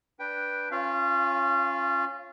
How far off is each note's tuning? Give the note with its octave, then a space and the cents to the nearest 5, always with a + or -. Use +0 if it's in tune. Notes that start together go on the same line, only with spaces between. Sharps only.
D4 +0 B4 -10 G5 +0
C#4 -20 F4 +0 F5 -30